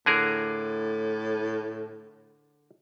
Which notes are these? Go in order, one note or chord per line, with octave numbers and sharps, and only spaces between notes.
A2 D3 G#4 A#4